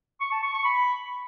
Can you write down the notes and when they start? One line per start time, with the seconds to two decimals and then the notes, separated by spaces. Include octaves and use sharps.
0.21 C#6
0.32 A5
0.43 C#6
0.54 C#6
0.64 B5